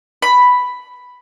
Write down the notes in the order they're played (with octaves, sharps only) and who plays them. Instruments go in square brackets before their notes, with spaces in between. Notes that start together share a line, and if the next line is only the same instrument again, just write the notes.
[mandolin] B5